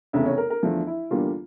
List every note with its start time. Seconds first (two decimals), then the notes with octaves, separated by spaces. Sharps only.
0.13 F1 E2 C#3 E5
0.26 C#5
0.38 A#4
0.50 A#4
0.63 E2 D3 F3 A3
0.87 E4
1.11 E2 D3 G3 A#3 F4